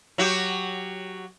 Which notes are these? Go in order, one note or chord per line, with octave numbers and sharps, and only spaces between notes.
F#3 F#4 G4